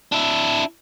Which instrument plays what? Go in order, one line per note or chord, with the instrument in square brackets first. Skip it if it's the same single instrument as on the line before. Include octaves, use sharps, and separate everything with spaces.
[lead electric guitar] D4 E4